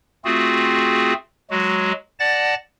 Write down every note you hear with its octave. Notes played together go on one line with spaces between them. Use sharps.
A3 C4 F4 F#4 G#4
F#3 G#3 F#4
D5 F#5 A5 A6 A#6